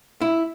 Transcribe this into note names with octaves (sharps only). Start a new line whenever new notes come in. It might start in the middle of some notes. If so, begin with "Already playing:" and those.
E4